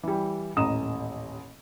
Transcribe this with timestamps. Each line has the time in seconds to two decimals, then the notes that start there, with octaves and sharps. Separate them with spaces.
0.03 E3 G3
0.56 D#1 A1 D#5 A#5 D#6 E7